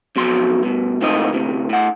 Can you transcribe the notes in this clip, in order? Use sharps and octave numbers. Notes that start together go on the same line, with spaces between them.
F2 B2 F#3 C6
G2 B2
C#2 A2 D#3 C4 F4 D#5
D2 A2 C3
A2 F#5